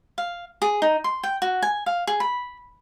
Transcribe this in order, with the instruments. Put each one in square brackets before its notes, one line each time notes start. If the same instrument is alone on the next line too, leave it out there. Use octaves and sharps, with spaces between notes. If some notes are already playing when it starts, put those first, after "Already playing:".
[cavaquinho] F5
G#4
D#4
C6
G5
F#4
G#5
F5
G#4
B5